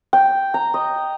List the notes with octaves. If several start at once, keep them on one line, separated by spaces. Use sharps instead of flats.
G5
A#5
D#5